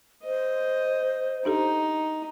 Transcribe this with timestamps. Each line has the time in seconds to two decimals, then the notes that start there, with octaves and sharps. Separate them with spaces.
0.24 C5 D#5
1.45 D4 D#4 G4 A4